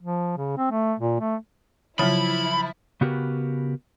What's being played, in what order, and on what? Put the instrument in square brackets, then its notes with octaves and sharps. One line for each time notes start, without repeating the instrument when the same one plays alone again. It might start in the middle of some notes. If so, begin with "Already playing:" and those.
[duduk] F3
C#3
C4
A3
A#2
A3
[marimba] C#3 F#3 F4 [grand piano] F3 [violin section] E4 [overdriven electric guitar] B5
[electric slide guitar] C#3 B3 F#4 G4 A#4 B4